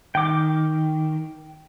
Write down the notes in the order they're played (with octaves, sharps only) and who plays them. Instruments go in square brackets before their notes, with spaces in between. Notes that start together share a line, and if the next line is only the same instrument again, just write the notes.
[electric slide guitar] D#3 [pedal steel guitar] G5 D6